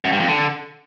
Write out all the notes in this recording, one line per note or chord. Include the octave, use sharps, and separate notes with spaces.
F#2
G2
F2
D3